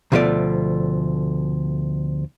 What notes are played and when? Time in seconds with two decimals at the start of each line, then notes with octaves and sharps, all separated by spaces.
0.12 D2 B2 F3 F#3 A3 D5